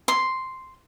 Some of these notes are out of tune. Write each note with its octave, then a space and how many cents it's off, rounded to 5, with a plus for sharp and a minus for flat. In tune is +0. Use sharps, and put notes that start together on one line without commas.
C6 +0